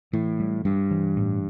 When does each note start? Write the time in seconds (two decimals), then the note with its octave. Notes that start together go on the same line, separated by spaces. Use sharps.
0.13 A2 E3
0.40 G3
0.65 G2 G3
0.91 E3
1.16 A2